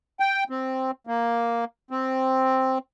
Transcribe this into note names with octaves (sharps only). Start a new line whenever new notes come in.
G5
C4
A#3
C4